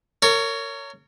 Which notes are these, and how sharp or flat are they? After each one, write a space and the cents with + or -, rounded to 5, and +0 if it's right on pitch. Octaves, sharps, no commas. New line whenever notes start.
A#4 -30 C#5 +15